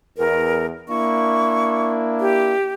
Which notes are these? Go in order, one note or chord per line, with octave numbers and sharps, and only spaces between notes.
E2 A#4
A#3 D4 E4 C#6
G4